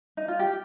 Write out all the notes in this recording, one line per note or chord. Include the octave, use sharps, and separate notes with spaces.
D#4
F4
G4